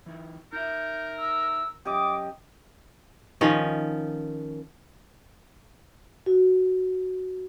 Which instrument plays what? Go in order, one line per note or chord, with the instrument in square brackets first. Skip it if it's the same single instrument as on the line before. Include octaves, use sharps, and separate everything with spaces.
[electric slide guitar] E3 D#4
[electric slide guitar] D#4 E5 [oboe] A#4 [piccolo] G6
[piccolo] E6
[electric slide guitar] F#2 C#4 [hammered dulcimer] G4 D#5 [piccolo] D6
[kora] D#3 F3 C#4
[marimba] F#4